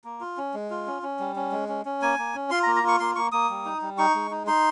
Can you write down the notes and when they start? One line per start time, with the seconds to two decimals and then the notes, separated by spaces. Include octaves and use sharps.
0.04 A#3
0.21 F4
0.37 C#4
0.54 G#3
0.70 F4
0.87 C#4
1.03 C#4
1.19 G3
1.36 C#4
1.52 G#3
1.69 C#4
1.85 C#4
2.02 A#3 G#5
2.18 A#3
2.34 C#4
2.51 F4 C6
2.63 A#5
2.67 A#3
2.76 A#5
2.83 F4 C#6
2.99 A#3 C6
3.16 A#3 C#6
3.32 A#3 D#6
3.50 G3
3.65 D#4
3.82 G3
3.98 D#4 C#6
4.15 G#3
4.31 D#4
4.47 D#4 C6